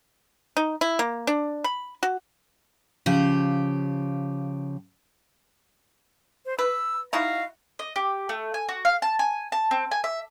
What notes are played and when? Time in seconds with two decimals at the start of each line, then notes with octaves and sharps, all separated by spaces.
0.57 D#4
0.81 E4
0.99 A#3
1.27 D4
1.64 B5
2.03 F#4
3.06 C#3 F3 G4
6.46 C5
6.59 B4 E6
7.13 D#4 E4 F#4 F5
7.79 D#5
7.96 G4
8.29 A3
8.54 G#5
8.69 F#4
8.85 F5
9.02 A5
9.19 G#5
9.52 A5
9.71 C4
9.91 G#5
10.04 E5